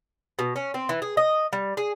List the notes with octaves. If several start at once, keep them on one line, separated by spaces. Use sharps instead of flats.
B2
C#4
C4
E3
G#4
D#5
G3
G#4